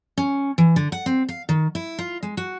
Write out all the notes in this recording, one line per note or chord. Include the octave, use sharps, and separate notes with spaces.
C#4
E3
D3
F#5
C4
F5
D#3
E4
F4
G#3
F#4